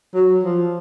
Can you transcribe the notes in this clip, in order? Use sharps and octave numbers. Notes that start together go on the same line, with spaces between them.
F#3
F3